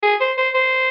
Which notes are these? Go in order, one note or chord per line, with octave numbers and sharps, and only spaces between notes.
G#4
C5
C5
C5